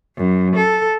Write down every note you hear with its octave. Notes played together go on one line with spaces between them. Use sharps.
F#2
A4